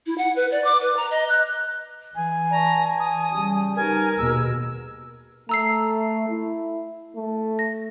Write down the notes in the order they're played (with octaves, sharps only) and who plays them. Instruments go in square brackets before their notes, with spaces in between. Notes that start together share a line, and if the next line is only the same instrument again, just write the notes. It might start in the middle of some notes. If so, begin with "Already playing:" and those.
[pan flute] E4
F#5
B4
D5
D6
B4
A#5
D#5
F#6
[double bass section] E3 [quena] G#5
[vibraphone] D5 A5 C#6 [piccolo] A#5
[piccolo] D#6
[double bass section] C#3 G3
[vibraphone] D#4 G4 B4 [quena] A#4 [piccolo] G#5
[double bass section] D#2 B2 [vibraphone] A#3 G#4 [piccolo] E6
[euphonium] A3 [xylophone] A#5 E6 C7
[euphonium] E4
A3
[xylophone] A#6